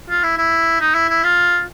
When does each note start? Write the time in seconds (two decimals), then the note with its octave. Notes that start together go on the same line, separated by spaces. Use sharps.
0.09 F4
0.23 E4
0.38 E4
0.81 D#4
0.95 E4
1.09 E4
1.24 F4